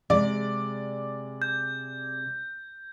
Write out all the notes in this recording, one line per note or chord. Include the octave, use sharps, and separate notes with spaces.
C3 G#3 D5
G6